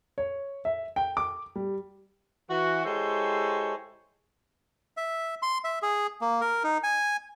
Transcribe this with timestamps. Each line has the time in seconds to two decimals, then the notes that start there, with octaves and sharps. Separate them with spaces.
0.18 C#5
0.65 E5
0.96 G5
1.17 D6
1.55 G3
2.50 E3 F#4
2.85 G#3 E4 G4 A4 C5 C#5
4.97 E5
5.42 C6
5.64 E5
5.82 G#4
6.21 A#3
6.41 A#4
6.64 D#4
6.83 G#5